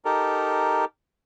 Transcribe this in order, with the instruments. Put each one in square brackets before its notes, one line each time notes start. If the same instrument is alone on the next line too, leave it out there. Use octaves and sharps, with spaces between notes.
[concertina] D#4 G4 A4 A#4